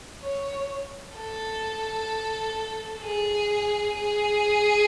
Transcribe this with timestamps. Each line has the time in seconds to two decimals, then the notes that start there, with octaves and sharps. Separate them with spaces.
0.22 C#5
1.17 A4
3.03 G#4
3.97 G#4